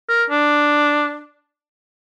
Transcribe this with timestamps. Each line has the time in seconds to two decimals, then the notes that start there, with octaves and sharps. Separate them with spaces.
0.09 A#4
0.30 D4